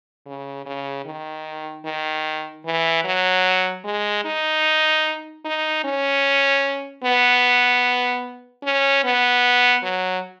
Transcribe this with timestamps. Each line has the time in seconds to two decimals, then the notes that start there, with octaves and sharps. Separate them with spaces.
0.26 C#3
0.66 C#3
1.06 D#3
1.85 D#3
2.65 E3
3.05 F#3
3.85 G#3
4.25 D#4
5.45 D#4
5.84 C#4
7.04 B3
8.63 C#4
9.04 B3
9.83 F#3